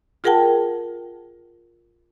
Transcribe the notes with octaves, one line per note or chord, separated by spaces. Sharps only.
F4 G#4 A#4 F#5 G5 A5